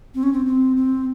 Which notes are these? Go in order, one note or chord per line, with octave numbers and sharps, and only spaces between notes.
C4
C#4
C4
C4
C4